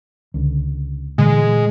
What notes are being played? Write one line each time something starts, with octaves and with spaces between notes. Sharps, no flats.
C#2 D3
A#2 D3 E3 G#3